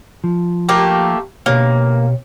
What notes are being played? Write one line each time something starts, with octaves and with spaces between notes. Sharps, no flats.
F3
A3 A#3 G4
B2 A#3 G4 C#5